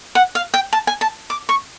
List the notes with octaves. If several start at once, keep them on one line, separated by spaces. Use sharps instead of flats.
F#5
F5
G5
A5
G#5
A5
D6
C#6